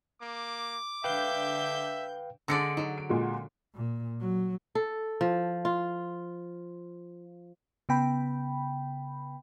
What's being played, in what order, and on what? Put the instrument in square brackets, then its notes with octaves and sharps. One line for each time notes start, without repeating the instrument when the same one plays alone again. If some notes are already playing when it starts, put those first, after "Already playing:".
[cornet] A#3 [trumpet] D6
[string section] D3 G6 [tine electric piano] B4 F5 G5 [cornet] E5
[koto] D3 G#3 D5 [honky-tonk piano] E6 A#6 C#7
[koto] F#3 [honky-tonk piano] D#4
[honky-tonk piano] D7
A#2 G#3 F#4
[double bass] A#2
F#3
[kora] A4
F3
F4
[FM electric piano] C#3 B3 G5 B5